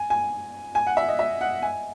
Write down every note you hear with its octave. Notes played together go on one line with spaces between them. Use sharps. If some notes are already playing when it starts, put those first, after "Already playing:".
Already playing: G#5
G#5
G#5
F#5
E5
D#5
E5
F#5
G#5